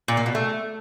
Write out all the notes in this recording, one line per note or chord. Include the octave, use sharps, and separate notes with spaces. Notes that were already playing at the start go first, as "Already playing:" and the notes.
A#2
A#3
B2
A3